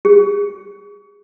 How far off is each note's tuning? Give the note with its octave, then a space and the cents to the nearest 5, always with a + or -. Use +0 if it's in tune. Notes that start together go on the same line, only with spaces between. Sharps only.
G#4 -35